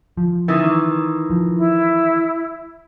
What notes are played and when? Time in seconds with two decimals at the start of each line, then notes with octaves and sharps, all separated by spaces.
0.17 F3
0.48 D#3 E3
1.30 F3
1.57 E4